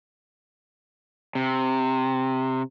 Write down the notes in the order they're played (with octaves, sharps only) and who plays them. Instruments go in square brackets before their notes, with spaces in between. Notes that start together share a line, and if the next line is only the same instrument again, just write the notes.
[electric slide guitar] C3